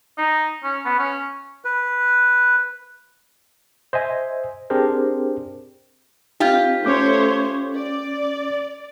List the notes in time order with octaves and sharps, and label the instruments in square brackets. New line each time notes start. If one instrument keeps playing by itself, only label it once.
[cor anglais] D#4
C#4
B3
C#4
[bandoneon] B4
[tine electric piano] C5 D#5 E5 G#5
C4 D4 G4 G#4 A#4 C5
[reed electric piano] C4 D#4 [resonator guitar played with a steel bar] F4 G4
[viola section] A3 C5 C#5 [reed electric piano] C#4 D6 G6
[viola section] D5